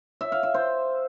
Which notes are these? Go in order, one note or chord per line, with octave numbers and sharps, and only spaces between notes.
E5
F5
E5
C5